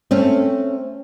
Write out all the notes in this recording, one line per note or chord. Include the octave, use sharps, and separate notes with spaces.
A3 C4 C#4